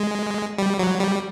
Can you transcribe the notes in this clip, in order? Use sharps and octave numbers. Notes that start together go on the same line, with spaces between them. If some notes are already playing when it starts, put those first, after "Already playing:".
Already playing: G#3
G3
F#3
G3